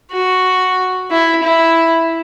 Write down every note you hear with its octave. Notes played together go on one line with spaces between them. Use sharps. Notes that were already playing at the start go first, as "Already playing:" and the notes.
F#4
E4
E4